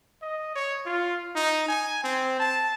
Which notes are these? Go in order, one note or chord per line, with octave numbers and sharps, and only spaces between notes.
D#5
C#5
F4
D#4
G#5
C4
A5